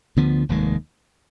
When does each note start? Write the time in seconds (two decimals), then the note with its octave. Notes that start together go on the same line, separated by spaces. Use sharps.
0.17 D2 D3 F3 B3
0.49 F1 D#2 D#3 G#3